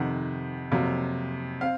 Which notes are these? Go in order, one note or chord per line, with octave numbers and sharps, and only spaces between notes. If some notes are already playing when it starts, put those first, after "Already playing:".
Already playing: F2 C3 D#3 F#5
F2 C3 F#3 A#3
C4 F5